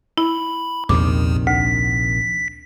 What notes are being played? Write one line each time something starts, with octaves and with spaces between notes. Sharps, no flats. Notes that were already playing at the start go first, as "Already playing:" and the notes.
E4 B5
A#1 E2 C3 D#3 D6
D2 B6